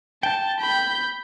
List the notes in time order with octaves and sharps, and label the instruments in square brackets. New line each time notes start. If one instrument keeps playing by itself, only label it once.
[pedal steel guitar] G5 [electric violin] A5
[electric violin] B5 G6